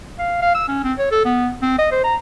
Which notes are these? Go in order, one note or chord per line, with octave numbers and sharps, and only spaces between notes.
F5
F5
E6
C#4
C4
C#5
A4
B3
C4
D#5
C5
A#5